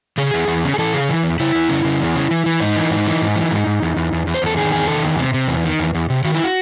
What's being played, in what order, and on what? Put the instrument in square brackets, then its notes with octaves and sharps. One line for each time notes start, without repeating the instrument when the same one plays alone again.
[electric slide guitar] C#3 G#4
E2
E2
C#3
G#4
E3 A4
C#3 G#4
E3
E2
C#3 E4
E2
C#3
C#3
E2
C#3
E3
E3
G#2 D#4
E3
G#2
E3
G#2
E3
G#2
G#2
E2
E2
E2
E2
C5
E2 A4
D#3 G#4
E2 G#4
D#3 A4
E2
C3
C3
E2
D#3
E2
E2
C3
D#3 F#4
E4
F#4